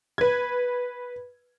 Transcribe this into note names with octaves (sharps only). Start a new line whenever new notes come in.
B4 G#6